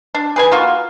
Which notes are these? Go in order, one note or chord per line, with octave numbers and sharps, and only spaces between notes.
D4
G#4 B4 G#5
A#3 F4 F#4